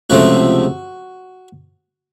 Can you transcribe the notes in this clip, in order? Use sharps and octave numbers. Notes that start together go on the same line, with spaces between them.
C#2 C3 F3 A3 C4 F#4